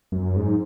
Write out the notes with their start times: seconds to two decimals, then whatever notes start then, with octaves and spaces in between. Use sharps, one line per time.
0.12 F#2
0.36 G#2